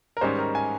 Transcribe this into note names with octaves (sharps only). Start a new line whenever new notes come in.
A#4
G#2 D#3 G3 C#4 C5
A#4
G#5